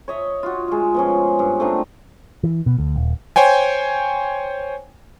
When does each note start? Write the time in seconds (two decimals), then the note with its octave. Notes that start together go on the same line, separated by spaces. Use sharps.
0.08 C#5 D#5 E5
0.43 F4 F#4
0.68 G#3 F4
0.94 B2 F3 C#4
1.39 G2
1.60 A3 C4 D4 D#4
2.43 E3
2.66 B2
2.79 D2
2.96 D#1
3.36 C5 C#5 G5 G#5